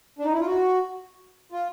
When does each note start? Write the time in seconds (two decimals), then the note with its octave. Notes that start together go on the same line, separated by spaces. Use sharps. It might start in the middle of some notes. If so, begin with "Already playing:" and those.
0.19 D4
0.25 D#4
0.33 E4
0.39 F4
0.47 F#4
1.52 F4